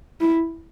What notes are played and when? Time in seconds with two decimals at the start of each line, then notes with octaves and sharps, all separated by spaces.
0.20 E4